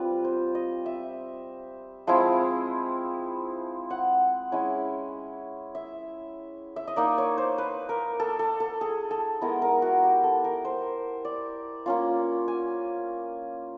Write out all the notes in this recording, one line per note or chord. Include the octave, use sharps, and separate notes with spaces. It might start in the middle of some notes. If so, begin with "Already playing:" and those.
Already playing: G3 C4 F4 B4
C5
D#5
E5
F3 G#3 C4 E4 F5
F#5
G#3 C#4 E4
E5
E5
D#5
A#3 D#4 D5
C#5
C5
B4
A#4
A4
A4
A4
G#4
A4
G#3 B3 E4 A#4
A#4
F#4
G4
A4
A#4
C5
D5
A#3 C#4 F4
G#5